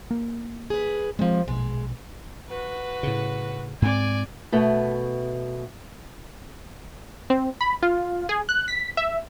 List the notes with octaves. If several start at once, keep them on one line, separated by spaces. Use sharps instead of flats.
A#3
G#4 B4
C3 F3 G#3 C4
A#1 B2 G#3
F#4 B4
A2 C#3
G#2 C4 D5 G#5
B2 A3 B3
C4
B5
F4
G#4
F#6
B6
E5